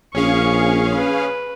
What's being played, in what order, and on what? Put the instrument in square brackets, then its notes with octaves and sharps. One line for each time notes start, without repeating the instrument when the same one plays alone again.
[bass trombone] A#1 [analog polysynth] C#4 G#4 F5 [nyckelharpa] C#6
[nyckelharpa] B4